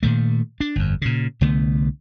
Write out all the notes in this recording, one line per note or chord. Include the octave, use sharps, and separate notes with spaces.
A#2 D#3 A3
D4
G1 F2
A#2 C#3
C2 D3 A3 B3